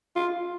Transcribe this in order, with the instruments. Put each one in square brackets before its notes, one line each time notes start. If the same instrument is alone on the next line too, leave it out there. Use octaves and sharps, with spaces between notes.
[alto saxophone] F4